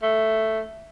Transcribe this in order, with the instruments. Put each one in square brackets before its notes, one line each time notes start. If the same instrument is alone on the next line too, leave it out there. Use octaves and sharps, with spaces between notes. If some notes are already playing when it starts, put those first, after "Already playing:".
[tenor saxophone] A3